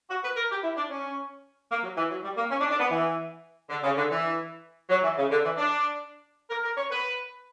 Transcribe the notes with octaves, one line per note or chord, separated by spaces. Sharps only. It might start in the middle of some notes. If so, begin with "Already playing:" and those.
F#4
B4
A#4
G4
E4
D4
C#4
A#3
F#3
E3
F#3
G3
A#3
C#4
D4
D4
B3
E3
D3
C#3
D3
E3
F#3
E3
C#3
D3
E3
D4
A#4
A#4
C#5
B4